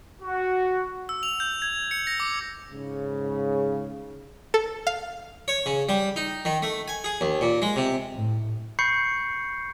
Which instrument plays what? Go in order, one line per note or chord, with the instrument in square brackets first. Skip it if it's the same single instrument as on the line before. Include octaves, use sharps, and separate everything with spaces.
[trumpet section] F#4
[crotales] E6
F7
G6
G#6
C#7
A#6
D6
[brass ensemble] G#2 C#3
[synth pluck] A4
F5
[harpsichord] C#5
C#3
G3
D#4
D#3
A3
G#5
G#4
D#2
A#2
G#3
C3
[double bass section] A2
[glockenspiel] B5 C#6 G6 C7 C#7